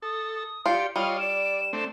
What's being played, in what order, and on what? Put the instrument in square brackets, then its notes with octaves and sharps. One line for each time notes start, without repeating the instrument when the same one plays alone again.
[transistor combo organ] A4 [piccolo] D#6
[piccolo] D#6
[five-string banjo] F4 [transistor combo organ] G4 D5 [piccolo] C#7
[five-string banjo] G3 [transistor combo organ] F4 C#5 D#5 [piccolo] F5
[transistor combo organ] D5 [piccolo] E7
[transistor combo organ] A3 C4 D4